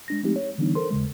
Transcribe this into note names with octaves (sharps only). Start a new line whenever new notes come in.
G#3 D4 A#6
F3 G#3 A3 C4 D#4 G4
C#5
D3 E3 G3 B3 D4 D#4
A4 A#4 C5 C6
D#2 C#3 G#3